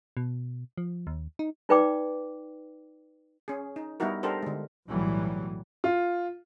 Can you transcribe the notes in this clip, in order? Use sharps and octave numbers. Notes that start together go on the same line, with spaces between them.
B2
F3
D#2
D#4
D#4 F4 B4 D5 G5 D6
C#4 G#4
D#4
G3 B3 D#4 E4 F#4 A#4
D4 G4 A4 A#4 C5
D3 G#3
B1 A2 E3 F#3 G3
F4